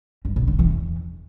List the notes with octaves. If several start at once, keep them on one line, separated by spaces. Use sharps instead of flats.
G2
A#2
D3
E3
E2